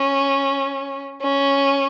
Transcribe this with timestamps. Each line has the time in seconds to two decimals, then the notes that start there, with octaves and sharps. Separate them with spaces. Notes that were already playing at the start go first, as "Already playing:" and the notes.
Already playing: C#4
1.22 C#4